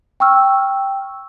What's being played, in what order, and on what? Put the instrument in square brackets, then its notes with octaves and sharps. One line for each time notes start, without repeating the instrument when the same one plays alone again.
[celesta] G5 C#6 E6 F6